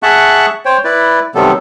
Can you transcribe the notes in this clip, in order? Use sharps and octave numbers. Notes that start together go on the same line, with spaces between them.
G#4 E5 F#5 A5 C#6 F#6
C5 C#5 G5
E4 B4 D5
C3 D#3 F#3 G3 B3 A4